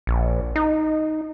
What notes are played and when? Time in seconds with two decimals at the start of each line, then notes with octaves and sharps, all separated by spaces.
0.07 A#1
0.56 D#4